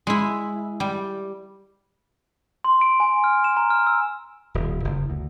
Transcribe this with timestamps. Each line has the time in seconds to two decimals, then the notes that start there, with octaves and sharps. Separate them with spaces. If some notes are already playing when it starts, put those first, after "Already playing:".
0.07 G#3 E4
0.80 G3
2.64 C6
2.81 D7
3.00 G#5
3.24 F6
3.44 E7
3.57 A#5
3.70 F6
3.87 E6
4.54 D#1
4.85 F#1
5.10 D2